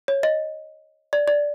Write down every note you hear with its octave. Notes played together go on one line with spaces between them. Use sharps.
C#5
D#5
D5
D5